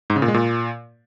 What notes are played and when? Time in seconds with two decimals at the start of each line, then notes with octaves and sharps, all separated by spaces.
0.10 G#2
0.16 C#3
0.22 A#2
0.28 G#3
0.34 A#2